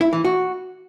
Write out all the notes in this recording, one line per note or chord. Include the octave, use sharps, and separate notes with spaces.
E4
E3
F#4